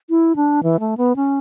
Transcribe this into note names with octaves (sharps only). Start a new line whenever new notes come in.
E4
D4
E3
A3
B3
C#4